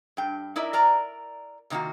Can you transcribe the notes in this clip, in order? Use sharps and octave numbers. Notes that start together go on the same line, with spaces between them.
G2 G5
D#4 E4 A#4 D5 E5
A#4 D5 A#5
C3 D#3 A#3 F4 F#4